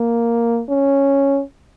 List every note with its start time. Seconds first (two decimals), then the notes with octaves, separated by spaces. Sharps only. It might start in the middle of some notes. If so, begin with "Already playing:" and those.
Already playing: A#3
0.69 C#4